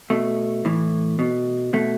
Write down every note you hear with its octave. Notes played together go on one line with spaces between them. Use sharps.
B2 A3
A2 E3
B2
B2 A3